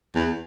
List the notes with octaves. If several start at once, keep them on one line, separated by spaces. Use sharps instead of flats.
E2